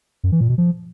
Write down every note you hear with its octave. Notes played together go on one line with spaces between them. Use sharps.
F#2
E3
A#2
B2
F3